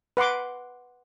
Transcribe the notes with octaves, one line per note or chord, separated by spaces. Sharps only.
B4 F#5 C6 D6